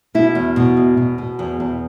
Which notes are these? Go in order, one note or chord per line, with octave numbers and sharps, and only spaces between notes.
B2 E4
E2
B2
E2
B2
B2
E2
E2